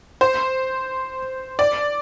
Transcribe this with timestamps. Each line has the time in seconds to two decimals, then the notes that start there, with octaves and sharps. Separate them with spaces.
0.21 C5
1.59 D5